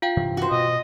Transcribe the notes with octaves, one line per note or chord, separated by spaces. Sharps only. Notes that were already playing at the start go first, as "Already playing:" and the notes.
F4 F5 G5
G2 C3 E3
F#4 C5
B2 D#5